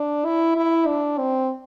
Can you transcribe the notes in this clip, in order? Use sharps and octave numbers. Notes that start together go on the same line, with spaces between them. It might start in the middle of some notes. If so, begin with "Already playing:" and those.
Already playing: D4
E4
E4
D4
C4